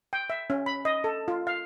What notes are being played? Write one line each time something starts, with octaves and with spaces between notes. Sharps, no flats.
G5
E5
C#4
B5
D#5
A4
F4
F5